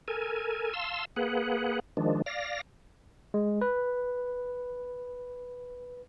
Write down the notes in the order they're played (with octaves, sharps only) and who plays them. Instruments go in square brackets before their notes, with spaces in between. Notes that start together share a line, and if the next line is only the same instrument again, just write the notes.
[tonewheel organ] A4 A#4 G#5
F5 A5 C6 E6
A#3 G#4 B4 F#5
D#3 F3 G#3 D4
D5 F5 A#6
[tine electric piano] G#3
B4